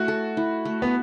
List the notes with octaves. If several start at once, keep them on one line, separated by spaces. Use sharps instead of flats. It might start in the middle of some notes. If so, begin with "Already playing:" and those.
Already playing: A3 E4 F#4
A4
E4
A3
B3